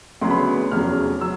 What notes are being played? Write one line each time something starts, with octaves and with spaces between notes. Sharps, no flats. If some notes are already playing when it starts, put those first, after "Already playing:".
D2 C#3 F#3 B3 C6
B5
C6
F1 E2 C#3 F#3 F6
F#3 E6